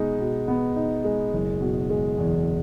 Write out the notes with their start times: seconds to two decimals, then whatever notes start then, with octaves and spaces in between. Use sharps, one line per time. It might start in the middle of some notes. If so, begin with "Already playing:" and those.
Already playing: B2 G#3 B3 D#4
0.20 B2
0.48 B3
0.76 D#4
1.04 G#3
1.33 F#1
1.61 B2
1.90 G#3
2.18 E2